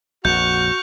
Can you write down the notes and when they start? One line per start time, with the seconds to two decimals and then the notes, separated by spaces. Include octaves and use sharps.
0.25 A#1 F2 F#4 C#6 F6 G6